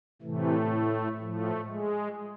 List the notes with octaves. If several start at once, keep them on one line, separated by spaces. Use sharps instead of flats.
A2 C3 E3 A3
A2 F3 A3
G#3